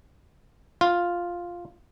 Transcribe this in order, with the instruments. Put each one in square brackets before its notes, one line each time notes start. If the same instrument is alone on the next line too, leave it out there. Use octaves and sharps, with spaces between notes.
[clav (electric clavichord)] F4